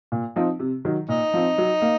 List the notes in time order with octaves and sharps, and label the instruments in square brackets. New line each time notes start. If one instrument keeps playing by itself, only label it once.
[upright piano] A#2
F3 C4 D#4
C3
D#3 F#3
[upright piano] A#2 [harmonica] D#4
[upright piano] F3 C4
F#3
A#3